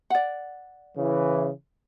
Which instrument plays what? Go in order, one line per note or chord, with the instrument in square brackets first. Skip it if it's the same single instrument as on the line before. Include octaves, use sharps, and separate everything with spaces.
[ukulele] D5 F#5
[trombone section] C#3 E3